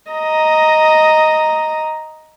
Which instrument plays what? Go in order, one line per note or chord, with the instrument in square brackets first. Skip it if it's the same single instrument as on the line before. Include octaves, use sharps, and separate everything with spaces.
[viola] D#5 A#5